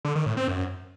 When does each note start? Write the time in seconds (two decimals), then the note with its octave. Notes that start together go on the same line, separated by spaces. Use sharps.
0.05 D3
0.15 D#3
0.26 A2
0.37 C4
0.48 F#2